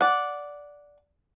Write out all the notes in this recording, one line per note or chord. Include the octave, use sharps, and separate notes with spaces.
D5 F#5